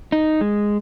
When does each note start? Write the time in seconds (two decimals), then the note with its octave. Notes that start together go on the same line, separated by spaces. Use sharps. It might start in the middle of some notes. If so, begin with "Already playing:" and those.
0.12 D#4
0.41 G#3